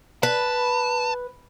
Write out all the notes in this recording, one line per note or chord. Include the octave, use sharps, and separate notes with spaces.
B4 A5